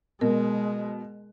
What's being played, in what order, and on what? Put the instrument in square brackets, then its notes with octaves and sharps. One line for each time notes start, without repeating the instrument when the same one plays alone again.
[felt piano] B2 [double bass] G#3 [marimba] A#4